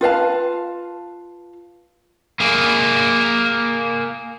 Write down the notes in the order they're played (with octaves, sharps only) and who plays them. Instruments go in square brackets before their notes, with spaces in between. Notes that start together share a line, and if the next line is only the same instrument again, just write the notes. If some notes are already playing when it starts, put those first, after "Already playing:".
[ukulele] F4 B4 F5 A5
[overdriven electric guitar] A#3 G#4